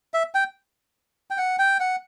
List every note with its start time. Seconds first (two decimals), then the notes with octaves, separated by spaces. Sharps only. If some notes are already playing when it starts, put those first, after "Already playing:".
0.14 E5
0.35 G5
1.31 G5
1.38 F#5
1.59 G5
1.80 F#5